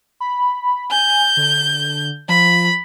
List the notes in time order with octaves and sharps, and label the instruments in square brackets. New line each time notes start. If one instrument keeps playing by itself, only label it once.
[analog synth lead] B5
[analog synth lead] G#5 [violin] G6
[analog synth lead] D3
[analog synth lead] F3 [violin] B5